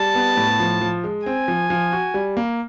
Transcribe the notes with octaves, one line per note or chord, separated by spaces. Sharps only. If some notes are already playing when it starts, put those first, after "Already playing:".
Already playing: G3 A5
B3
A2
F3
F3
G#3
C4 G#5
F3
F3
F#4
G3
A#3